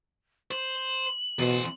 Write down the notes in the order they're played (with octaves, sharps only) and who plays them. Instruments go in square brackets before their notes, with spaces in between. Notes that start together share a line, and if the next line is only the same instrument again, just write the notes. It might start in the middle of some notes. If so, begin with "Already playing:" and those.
[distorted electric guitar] C5 [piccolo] F#7
[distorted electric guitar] E2 C5 [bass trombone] B2